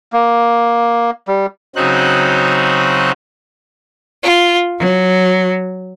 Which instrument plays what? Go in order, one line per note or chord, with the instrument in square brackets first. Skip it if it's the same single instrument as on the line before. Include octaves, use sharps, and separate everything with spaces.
[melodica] A#3
G3
[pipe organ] C#3 F#3 C4 D#4 F#4 F#6
[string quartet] F4
F#3